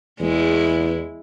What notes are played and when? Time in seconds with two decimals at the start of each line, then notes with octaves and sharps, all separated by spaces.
0.20 E2 G#3 E4